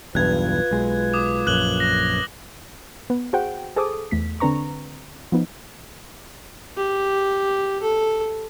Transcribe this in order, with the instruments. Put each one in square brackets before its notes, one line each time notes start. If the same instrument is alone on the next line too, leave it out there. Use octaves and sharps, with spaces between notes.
[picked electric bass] B1 E2 G2 [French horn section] F4 B4 [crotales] F#6 G#6
[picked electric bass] B1 G#3
[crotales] D6 D#6
[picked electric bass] A#1 F#2 [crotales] F#6 F#7 G7
[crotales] A#6
[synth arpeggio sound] B3
F#4 G#4 C5 F#5 G5
G#4 A4 C5 D6 D#6
E2 A3 B6
D3 C4 D4 B4 A#5 C#6
F3 B3 D#4
[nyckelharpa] G4
A4